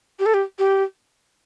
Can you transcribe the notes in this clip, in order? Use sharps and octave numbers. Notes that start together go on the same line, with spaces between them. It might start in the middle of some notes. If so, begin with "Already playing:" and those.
G4
A4
G4
G4